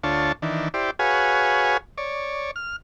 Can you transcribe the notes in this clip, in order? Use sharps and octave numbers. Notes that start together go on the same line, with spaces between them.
D2 D4 F4 C#5 A5
D#3 E3 D4
E4 G4 C5 D5
F#4 G#4 B4 C#5 F5 G#5
C#5 D5
F6